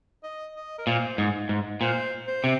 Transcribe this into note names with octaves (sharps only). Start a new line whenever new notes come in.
D#5
D#5
A#4
A#2 C5
G#2
G#2
A#2 C5
C5
C3